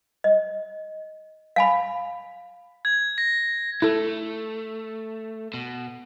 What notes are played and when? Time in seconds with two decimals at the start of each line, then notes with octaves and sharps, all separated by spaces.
0.24 D#5
1.56 F5 G#5 B5
2.85 G#6
3.18 A#6
3.82 A3 E4 A4
5.54 B2